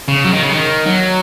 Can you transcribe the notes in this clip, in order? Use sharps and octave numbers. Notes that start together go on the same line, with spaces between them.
C#3
F#3
D#3
C#3
D#3
F#3